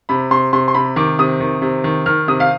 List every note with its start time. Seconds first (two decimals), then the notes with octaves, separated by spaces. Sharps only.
0.09 C3 B5
0.31 C3 C6
0.53 C3 C6
0.68 C6
0.75 C3 B5
0.96 D#3 D6
1.19 C3 D#6
1.40 D#3
1.62 C3
1.84 D#3
2.06 D#3 F6
2.28 C3 D#6
2.40 F5